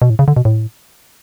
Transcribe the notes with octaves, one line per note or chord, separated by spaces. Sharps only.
B2
A2
C#3
D3
B2
A2